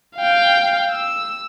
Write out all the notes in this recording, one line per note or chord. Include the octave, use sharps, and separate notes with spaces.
F5 G5
E6